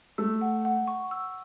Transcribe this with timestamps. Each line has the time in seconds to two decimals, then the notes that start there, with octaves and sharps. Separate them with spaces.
0.18 A3 E6
0.41 F#5
0.65 F#5
0.88 C#6
1.11 E6